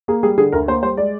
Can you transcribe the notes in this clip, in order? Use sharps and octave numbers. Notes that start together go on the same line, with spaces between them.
A#3 G#4
G3 G#4
D3 G#4
D2 A#4
A#3 C5
G3 C5
G#3 D5